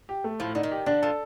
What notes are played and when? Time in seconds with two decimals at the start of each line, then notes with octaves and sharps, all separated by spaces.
0.09 G4
0.24 A3
0.40 A2 F3
0.55 D3 D#4
0.63 D#3
0.71 G4
0.86 D3 D4
1.02 F3 A4